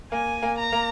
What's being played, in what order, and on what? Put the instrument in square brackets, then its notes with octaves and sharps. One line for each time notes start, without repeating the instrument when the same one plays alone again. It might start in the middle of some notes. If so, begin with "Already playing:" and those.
[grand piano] A#3 [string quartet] G#5
[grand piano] A#3
[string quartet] A#5
[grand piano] A#3